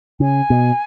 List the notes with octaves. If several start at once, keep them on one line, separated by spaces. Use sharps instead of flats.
C#3 G#5
B2